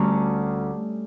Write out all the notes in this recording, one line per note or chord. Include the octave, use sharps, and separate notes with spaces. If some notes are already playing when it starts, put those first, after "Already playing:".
Already playing: D2 D3 G3 C#4 A#5 C#6